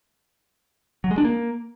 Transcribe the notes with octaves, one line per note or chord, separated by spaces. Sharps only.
F#3
G#3
D4
A#3